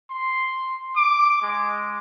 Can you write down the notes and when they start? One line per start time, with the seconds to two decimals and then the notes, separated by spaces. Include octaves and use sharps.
0.10 C6
0.96 D6
1.42 G#3